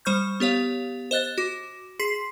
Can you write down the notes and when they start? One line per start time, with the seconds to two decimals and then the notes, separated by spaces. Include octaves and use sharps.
0.05 G3 C5 C#6 F6 G6
0.40 B3 G4 C#5 F5
1.11 C5 D#5 F#6 A6
1.38 F#4 D6
1.99 G#4 C6 B6 C7